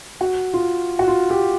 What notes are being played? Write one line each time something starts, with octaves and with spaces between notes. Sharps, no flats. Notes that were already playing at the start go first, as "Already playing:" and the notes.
F#4
F4
F#4
F4
G4